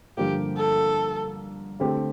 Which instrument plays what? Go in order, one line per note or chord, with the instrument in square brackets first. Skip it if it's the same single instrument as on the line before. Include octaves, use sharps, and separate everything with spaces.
[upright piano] G2 D3 F3 A#3 [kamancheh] G4
[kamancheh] A4
[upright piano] D3 A3 C4 G4